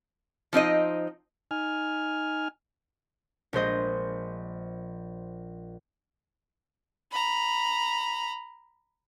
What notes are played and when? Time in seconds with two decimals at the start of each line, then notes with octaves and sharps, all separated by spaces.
0.53 F3 C4 D#4 D#5
1.51 D#4 G#5 F6
3.53 A#1 G#3 C5 D#5
7.11 A#5 B5